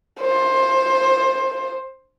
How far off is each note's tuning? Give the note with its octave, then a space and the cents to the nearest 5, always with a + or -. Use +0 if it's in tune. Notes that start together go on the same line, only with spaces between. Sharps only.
C5 +15